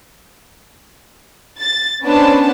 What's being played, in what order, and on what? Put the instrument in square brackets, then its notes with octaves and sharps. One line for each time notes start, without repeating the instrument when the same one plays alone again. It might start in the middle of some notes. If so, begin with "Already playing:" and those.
[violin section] A6
B3 C#4 D4 B4 C5 A5